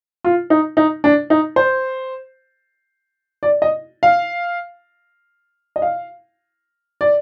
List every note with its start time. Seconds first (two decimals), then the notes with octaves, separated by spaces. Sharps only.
0.24 F4
0.50 D#4
0.77 D#4
1.04 D4
1.30 D#4
1.56 C5
3.43 D5
3.62 D#5
4.03 F5
5.76 D#5
5.82 F5
7.01 D5